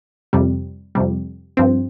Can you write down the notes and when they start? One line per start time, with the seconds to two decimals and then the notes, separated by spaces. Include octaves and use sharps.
0.33 F2 C3 G3
0.95 F2 C3 G3
1.57 G2 F3 C4